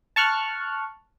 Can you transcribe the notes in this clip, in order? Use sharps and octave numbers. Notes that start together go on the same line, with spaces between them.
A5 C#6 F6 F#6